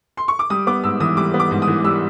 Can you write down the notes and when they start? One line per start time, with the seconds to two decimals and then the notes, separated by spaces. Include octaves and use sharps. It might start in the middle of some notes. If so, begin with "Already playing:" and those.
0.17 C6
0.28 C#6
0.39 D6
0.50 G3 D#6
0.67 B3 D6
0.84 G#2 E6
1.00 E3 D#6
1.17 G3 D6
1.34 B3
1.40 D6
1.51 G#2
1.62 D#6
1.67 E3
1.84 G3 E6